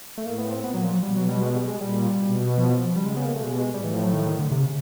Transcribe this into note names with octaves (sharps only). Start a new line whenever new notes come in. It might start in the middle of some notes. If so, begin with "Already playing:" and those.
A3
A2 A#3
B3
C4
A#2 B3
F#3
F3
F#3
B2 G3
F#3
G3
G#3
G3
G#3
A#2 G3
B2
F3
C#3 G3
G#3
B3
A#3
B2 A3
G#3
G3
G#3
A2 G3
E3
F3
F#3
D#3
D#3
D3
C3
C#3